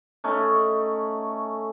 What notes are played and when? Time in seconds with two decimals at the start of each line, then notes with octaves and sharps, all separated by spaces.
0.24 A3 C#4 D#4